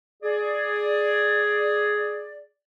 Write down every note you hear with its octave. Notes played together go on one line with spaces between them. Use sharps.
G#4 D5